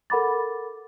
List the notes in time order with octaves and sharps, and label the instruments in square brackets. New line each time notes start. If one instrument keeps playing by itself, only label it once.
[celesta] A4 A#4 F#5 B5 D6 A6